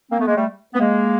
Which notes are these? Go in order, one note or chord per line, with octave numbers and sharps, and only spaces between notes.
A#3 C4
A3 B3
G#3 A#3
G3 A3
B3
G#3 A#3